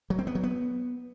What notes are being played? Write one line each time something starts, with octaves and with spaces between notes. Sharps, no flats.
F#3
C4
B3
F#3
B3